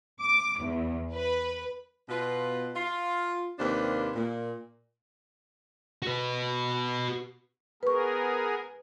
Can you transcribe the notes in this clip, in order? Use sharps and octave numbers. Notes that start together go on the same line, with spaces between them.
D6
E2
B4
B2 F4 B4
F4
D#2 C3 A#3 D4 B4 C5
A#2
F#4 B4
B3 G#4 A#4 B4 C#6